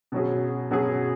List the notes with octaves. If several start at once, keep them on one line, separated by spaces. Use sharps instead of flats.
B2 F#3 C#4 G#4
B2 F#3 C#4 G#4